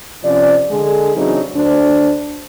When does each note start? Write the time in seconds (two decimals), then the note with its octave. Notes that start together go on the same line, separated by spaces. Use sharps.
0.24 C3 F3 C#4 D5
0.70 D3 G#3 G#4
1.15 C#3 E3 F#3 C4 D4 D#4
1.55 D2 D4 C5